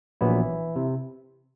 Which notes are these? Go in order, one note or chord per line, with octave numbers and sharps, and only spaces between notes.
A#1 A#2 E3 F#3 B3 E4
C3